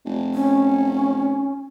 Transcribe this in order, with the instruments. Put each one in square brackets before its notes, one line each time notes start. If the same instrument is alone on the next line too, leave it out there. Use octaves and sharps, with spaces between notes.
[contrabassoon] F1
[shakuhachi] C#4